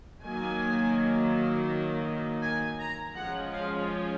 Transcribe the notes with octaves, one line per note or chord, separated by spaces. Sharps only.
D#3 F#3 A#3 G#5
G#5
A#5
F3 G#3 C#4 F4 F#5
F5